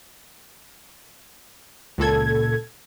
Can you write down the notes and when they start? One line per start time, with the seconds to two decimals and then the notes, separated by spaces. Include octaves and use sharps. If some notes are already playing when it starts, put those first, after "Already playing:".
1.98 C#2 A#2 A4 G#6